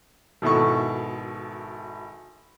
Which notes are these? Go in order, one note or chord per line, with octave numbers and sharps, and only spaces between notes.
G#1 B2 E4 A4 C#6